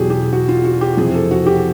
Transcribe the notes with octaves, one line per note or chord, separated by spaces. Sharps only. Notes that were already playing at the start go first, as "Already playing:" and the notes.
Already playing: E2 B2 F#3 G4 G#4
G4
F#4
F4
F#4
G4
F2 C3 E3 G#4
A4
F#4
G4